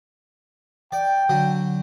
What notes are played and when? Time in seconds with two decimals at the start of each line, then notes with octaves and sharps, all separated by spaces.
0.92 D5 G5
1.29 D3 F#3